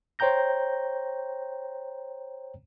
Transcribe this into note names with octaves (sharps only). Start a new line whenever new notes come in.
C5 C#5 G5 A#5 G6 A#6